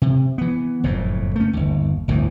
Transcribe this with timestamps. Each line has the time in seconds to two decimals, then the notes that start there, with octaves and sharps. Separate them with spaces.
0.02 C3
0.38 E3 B3
0.84 F#1 F2 A2
1.36 A3 C#4
1.53 G1 D#2
2.08 G1 D2 A2 E3